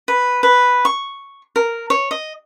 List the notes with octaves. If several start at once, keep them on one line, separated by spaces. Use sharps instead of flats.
B4
B4
C#6
A#4
C#5
D#5